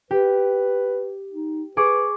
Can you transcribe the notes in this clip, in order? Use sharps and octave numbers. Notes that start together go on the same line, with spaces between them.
G4 B4
D#4
G#4 B4 C#6 D6